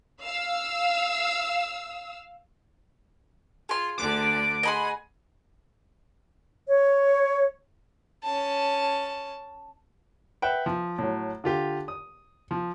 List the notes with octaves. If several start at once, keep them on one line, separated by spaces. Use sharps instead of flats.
F5 E6
F4 G#4 C6
D2 D3 D5 D6
G#4 D#5 F#5 G#5 B5 C6
C#5
C#4 A5
B4 E5 F#5 G5
F3
A2 F#3
D3 F4 G4
D#6
F3